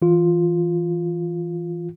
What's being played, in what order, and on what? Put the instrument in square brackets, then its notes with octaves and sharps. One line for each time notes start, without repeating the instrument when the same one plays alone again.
[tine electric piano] E3 F4